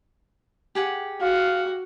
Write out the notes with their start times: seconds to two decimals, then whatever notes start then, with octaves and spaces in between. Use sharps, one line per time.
0.75 G4 G#4 F#5
1.21 F#4 F5